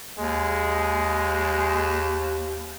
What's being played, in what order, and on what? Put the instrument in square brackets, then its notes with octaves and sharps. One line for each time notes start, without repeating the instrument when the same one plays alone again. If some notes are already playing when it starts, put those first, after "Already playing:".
[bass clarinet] D#2 [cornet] G#3